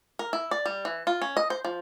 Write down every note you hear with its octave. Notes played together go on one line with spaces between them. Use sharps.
A#4
E4
D5
G3
E3
F4
C#4
D#5
C5
F3